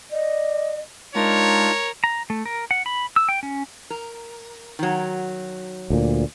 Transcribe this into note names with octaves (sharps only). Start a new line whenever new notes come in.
D5 D#5
G#3 D4 D#4 F4 A#4 C#5
A#5
A3
A#4
F#5
B5
E6
G5
C#4
A#4
D#3 F#3
D2 A#2